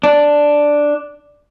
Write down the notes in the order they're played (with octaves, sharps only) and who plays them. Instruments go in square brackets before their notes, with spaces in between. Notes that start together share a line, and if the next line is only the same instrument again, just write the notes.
[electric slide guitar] D4